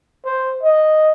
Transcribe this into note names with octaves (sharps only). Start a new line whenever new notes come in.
C5
D#5